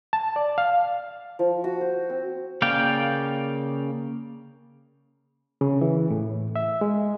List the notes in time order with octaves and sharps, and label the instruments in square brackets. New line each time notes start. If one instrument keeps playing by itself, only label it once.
[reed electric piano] A5
D5
F5
[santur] F3
F#4
C5
C4
[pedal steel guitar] C#3 A#3 D5 F5 G5
[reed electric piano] C#3
E3
A2
E5
G#3